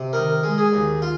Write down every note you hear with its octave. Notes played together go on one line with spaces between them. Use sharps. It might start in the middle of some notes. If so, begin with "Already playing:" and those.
Already playing: C3
D#3 A#4
G#3
G#4
D#2
F4